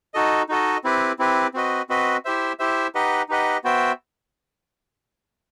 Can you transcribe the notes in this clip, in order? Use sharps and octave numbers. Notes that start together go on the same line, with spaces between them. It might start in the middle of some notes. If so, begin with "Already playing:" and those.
D#4 F#4 A4 D#5
D#4 F#4 A4 D#5
C4 E4 G4 B4
C4 E4 G4 B4
C4 F#4 B4 D#5
C4 F#4 B4 D#5
E4 G4 C5 E5
E4 G4 C5 E5
D#4 G4 B4 D#5 F#5
D#4 G4 B4 D#5 F#5
B3 F#4 C5 E5 G5